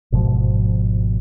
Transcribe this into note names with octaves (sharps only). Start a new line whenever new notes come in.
G#1 G#2 B2 F3